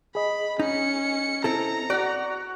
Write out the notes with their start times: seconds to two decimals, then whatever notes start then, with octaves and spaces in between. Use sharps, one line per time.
0.15 G#4 D#5 B5
0.60 C#4 D#4 C#7
1.44 C4 E4 A4 A#5
1.90 F#4 D5 F#5